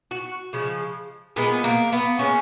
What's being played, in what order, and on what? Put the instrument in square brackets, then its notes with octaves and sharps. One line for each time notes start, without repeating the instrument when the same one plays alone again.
[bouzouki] F#4
C#3 F3 G#3
A#2 G#3 B3
A#3
B3
A#2 G#3 C#4